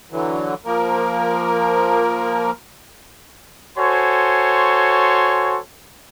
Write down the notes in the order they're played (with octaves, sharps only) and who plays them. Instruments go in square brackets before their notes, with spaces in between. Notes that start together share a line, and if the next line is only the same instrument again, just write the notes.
[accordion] D3 E3 F#3
F3 A#3 A#4
[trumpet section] F#4 A4 C5 C#5 G#5 C6